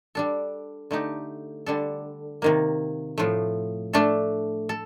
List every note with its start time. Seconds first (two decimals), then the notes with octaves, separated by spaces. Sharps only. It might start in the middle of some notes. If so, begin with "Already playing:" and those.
0.15 G3 D4 A4
0.91 D3 A3 D#4 G4
1.66 D3 G3 D4 A4
2.42 C3 D#3 A#3
3.18 A2 F3 A3
3.93 A3 D4 A4
4.69 A4